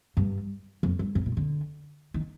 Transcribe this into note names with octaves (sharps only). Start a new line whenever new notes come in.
G2
F2
G2
G#2
B2
D3
D#3